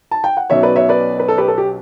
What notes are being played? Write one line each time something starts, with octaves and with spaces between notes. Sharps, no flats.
A5
G5
F#5
B1 B2 F#3 C#4 C#5 E5
B4 D5
C#5 E5
B4 D5
B4
A4
G4 B4
A4
G4